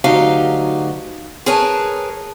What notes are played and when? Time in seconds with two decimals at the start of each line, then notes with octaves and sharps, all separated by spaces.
0.04 D2 F#3 D#4 G4 F5
1.46 G#4 A#4 B4 C#5 G#5 A5